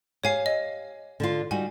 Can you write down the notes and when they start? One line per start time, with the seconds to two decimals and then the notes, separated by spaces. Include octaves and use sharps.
0.24 G4 C#5 F5 G#5 C7
0.46 D#5
1.20 D3 D4 F4
1.51 G3 D#4 F#4 G#5